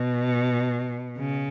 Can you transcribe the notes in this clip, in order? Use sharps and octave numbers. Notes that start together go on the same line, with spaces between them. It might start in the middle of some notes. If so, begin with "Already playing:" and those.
Already playing: B2
C#3